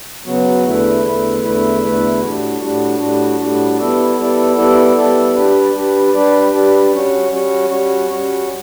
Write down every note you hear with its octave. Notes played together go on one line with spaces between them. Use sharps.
C#3 F#3 B3 F#4
E2 D3 A3 E4 B4
E2 D3 A3 E4 B4
E2 D3 A3 E4 B4
E2 D3 A3 E4 B4
A2 G3 D4 F#4
A2 G3 D4 F#4
A2 G3 D4 F#4
A2 G3 D4 F#4
G3 B3 E4 A4 D5
G3 B3 E4 A4 D5
G3 B3 E4 A4 D5
G3 B3 E4 A4 D5
G3 D4 G4 B4 D5
G3 D4 G4 B4 D5
G3 D4 G4 B4 D5
G3 D4 G4 B4 D5
G3 C#4 F#4 C#5
G3 C#4 F#4 C#5
G3 C#4 F#4 C#5
G3 C#4 F#4 C#5